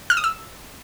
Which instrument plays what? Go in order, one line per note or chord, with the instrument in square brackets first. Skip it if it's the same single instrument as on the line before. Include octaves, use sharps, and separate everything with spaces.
[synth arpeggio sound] F6
D#6
E6